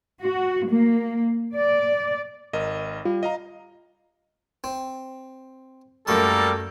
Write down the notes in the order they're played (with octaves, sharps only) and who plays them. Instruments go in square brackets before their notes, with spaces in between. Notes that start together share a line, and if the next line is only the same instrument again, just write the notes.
[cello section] F#4
A#3
D5
[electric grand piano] G#1 A#4 D#5
[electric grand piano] G3 [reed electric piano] F4
[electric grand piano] D#5 F5 A#5
[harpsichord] C4
[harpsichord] F#2 A3 A5 [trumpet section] G3 A#3 A#4 [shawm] A4